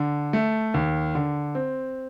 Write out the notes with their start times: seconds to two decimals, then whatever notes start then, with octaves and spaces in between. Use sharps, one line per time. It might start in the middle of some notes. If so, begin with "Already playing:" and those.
Already playing: D3
0.33 A3
0.74 D#2
1.15 D3
1.55 C4